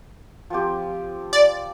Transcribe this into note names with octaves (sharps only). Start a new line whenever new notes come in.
F3 C4 G4
D5